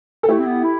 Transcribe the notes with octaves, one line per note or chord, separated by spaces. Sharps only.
A4
A3 E4 G4
C4
B3
E4